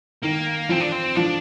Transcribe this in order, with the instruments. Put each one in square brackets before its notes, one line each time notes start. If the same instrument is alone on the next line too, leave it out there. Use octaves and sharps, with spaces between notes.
[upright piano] D#3 [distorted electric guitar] A#3
[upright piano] F3 [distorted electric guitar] C4
[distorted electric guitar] D4
C4
[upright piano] F3 [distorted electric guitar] D4